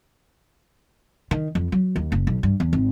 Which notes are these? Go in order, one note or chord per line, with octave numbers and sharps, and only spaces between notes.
D#3
F2
F#3
D#2
F#1
B1
G2
E2
G#1